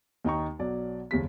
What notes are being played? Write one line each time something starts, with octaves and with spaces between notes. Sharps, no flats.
D#2 D#4 G5 A#5 C#6
B1 F#3 D5
F#1 D#2 G3 B6